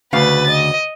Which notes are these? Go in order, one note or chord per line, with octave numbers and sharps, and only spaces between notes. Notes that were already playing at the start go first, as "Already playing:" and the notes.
D2 C#3 B4 F5 A6
D#5